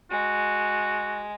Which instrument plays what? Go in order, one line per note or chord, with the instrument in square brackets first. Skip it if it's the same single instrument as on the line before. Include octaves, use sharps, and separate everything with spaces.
[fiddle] G#3 [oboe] F#4